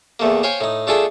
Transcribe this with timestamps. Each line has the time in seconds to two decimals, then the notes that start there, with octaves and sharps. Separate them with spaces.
0.20 E2 A3 A#3
0.43 C5 C#5 F5 G5 G#5
0.61 A2 D#4
0.87 A3 D4 F4 G#4 A4